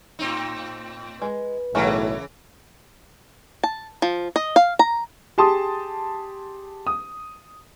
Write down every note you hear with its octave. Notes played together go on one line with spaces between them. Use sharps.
A2 C4 D#4
G#3 B4
B1 A2 C#3 E3 A3 C#4 A#4
A5
F3
D#5
F5
A#5
G4 G#4 A5 C6 D#6
D#6